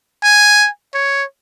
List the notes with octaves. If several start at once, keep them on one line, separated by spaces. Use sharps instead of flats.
G#5
C#5